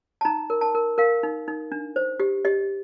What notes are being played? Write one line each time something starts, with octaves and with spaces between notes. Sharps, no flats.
A5
D#4 A#5
A#4
A5
A#4
A#4 F5
D#4
D#4
D4
C5
G4
G4 D#5